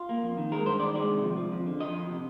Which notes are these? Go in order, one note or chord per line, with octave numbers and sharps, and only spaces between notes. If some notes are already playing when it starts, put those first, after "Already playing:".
Already playing: F4
A#3
F2
D#3
G#3 A#4
G2 C5
D#3 D5
G#3 D5
C3
F3
F3
F2
D3
F3 D#5
F2
C3